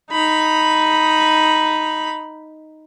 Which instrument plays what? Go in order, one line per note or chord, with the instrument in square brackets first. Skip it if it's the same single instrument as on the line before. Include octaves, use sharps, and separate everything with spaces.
[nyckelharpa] D#4 B5